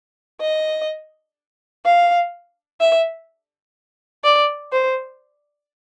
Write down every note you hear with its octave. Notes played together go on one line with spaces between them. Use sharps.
D#5
F5
E5
D5
C5